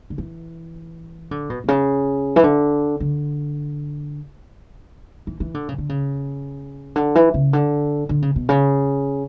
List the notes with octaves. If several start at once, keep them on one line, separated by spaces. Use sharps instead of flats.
D3
E3
D3
B2
B2
C#3
E3
D3
D3
E3
E3
D3
C#3
D3
C#3
D3
E3
C#3
D3
D3
C#3
B2
C#3